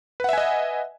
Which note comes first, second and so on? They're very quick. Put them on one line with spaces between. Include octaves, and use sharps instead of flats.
B4 F#5 E5 G#5 D#5